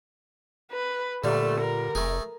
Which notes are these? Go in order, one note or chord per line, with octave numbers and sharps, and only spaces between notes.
B4
A#2 D3 G3 A3
A#4
F1 A3 G#4